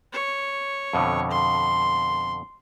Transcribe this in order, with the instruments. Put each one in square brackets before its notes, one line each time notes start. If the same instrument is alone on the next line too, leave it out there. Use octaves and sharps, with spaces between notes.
[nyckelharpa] C#5
[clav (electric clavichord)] F2 B2 D3
[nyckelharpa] C6